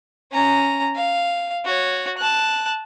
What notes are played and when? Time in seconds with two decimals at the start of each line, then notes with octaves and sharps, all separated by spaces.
0.32 C#4 A#5
0.96 F5
1.65 F#4 C#5
2.18 A5 F#6